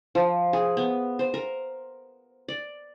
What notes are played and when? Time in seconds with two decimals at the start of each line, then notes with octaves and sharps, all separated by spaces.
0.15 F3
0.53 G#4
0.77 B3
1.19 C5
1.34 A#4
2.48 D5